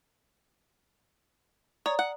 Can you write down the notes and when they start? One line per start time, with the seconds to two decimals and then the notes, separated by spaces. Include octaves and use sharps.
1.86 C#5 D5 A#5 D#6
1.99 F#5